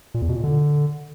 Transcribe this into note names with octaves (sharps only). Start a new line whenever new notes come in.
A#2
E2
B2
A#2
D3